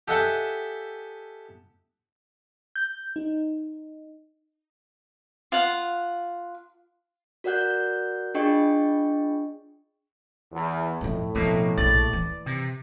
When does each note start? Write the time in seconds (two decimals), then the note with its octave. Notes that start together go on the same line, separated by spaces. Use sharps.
0.08 G4 A4 D#5 E5 F#5 G#5
2.76 G6
3.16 D#4
5.52 F4 F5 F#5
7.44 F#4 A#4 D5 F#5 F#6 G6
8.34 D4 F4 G#4 D#5 G5 C#6
10.53 E2
11.01 F2 A2 F3
11.35 B2 F3 A#3 C4
11.78 A#1 D5
12.13 E3
12.46 C3